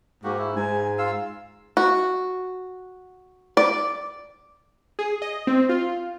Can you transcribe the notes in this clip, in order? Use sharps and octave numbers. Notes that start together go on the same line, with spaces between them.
G#2 A#3 F#4 G4
E4
G#2 G#5
F4 F5 E6
F#4
D5
G#4
D#5
C4
F4